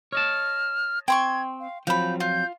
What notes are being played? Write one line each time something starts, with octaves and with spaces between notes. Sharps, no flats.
C#5 D#5 A5 F6
C4 G5 C6 C#6 G#6
F5
F3 F#3 C4 F5 B5 G6
F4 G6